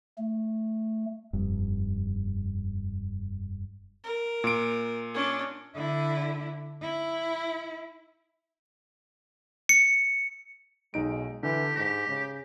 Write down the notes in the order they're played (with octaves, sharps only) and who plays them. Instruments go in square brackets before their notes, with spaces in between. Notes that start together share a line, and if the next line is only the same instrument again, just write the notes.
[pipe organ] A3
[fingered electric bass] F1 G2
[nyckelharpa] A#4
[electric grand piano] A#2 D7
[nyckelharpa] C#4 D4
[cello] D3 E4
E4
[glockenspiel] C#7
[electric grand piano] B1 D#4 D7 [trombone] G#3
[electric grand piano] D3 [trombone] E3 [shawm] G4
[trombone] G#2 [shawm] G4 [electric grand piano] A#6 B6
[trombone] C#3